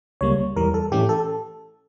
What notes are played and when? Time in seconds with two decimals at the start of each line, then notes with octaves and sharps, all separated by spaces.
0.21 C#2 C#3 G3 A#3 C#5
0.56 E2 E3 G3 A#4
0.74 A4
0.92 A2 E3 A3 C#4 G4
1.09 A4